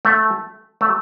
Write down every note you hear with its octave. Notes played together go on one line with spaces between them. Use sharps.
A3
A3